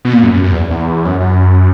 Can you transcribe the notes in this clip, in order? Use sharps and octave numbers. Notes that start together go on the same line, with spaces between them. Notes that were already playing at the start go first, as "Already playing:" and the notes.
B2
A#2
F#2
F#2
F#2
E2
E2
F#2
F#2